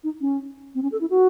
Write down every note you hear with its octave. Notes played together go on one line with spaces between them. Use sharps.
D#4
C#4
C4
C#4
A4
E4
F#4